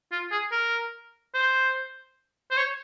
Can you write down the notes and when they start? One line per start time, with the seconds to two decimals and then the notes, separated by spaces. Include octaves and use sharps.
0.12 F4
0.31 G#4
0.52 A#4
1.34 C5
2.51 C5
2.57 C#5